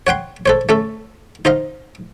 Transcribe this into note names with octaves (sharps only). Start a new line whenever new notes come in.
C#5 F#5 G5 C6
A4 C5 C#5
A3 C#4 A4
D#4 C5 D#5 F5